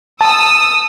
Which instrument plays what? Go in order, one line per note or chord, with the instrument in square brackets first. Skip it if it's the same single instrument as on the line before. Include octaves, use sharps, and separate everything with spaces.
[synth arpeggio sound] A5 [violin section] D#6 E6